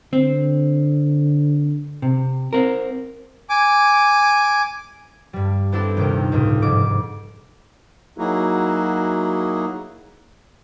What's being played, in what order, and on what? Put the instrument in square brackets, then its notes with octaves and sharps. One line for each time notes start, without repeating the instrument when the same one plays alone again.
[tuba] D3 [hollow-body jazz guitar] C4
[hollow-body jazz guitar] C3
C4 A#4
[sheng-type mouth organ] G#5 D6
[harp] G2 G3
B3 C4 D4 E4 G4 A4
D#1 D#2 C3 A#4 G5
C#2 A2
F1 G#2 D6
[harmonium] F#3 A#3 D#4 E4 F#4 G#4